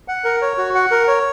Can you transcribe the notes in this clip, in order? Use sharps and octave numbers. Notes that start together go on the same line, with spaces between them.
F#5
A#4
C#5
F#4
F#5
A#4
C#5